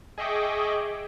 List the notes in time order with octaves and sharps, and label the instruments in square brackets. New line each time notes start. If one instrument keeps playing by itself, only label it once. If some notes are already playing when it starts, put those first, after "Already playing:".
[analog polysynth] G#4 D#5 E5 G5 C#6 D6